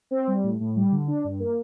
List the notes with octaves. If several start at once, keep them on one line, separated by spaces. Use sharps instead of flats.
C4
G3
A2
A2
G3
D3
D4
G2
A#3